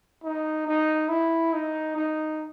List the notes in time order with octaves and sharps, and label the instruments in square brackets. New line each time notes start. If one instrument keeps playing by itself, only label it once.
[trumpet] D#4
D#4
E4
D#4
D#4